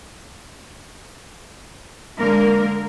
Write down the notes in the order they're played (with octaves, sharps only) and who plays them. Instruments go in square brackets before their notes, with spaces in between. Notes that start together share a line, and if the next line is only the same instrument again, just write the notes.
[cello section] D3 G#3 A#3 A#4